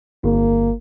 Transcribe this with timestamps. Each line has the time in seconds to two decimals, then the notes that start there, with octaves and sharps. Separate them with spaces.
0.24 G1 A#3